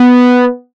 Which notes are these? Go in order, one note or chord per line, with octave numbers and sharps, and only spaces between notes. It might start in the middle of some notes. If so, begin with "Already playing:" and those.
Already playing: B3